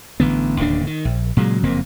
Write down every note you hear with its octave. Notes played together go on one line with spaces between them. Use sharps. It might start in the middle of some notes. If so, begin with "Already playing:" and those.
A1 D3 B3
D1 D#2 C#3 D4
D#3
A#1
A#2 C#3 F#3 G#3
F#1 F2 A#3 C4